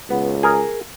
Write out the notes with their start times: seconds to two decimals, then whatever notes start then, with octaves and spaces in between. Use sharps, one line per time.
0.10 C#2 B3
0.43 G#4 A#4